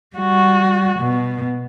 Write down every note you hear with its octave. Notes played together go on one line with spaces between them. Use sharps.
G3 F#4
B2